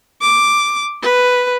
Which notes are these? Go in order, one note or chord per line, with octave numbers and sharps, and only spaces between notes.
D6
B4